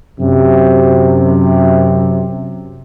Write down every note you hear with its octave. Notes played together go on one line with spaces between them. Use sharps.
F#2 C3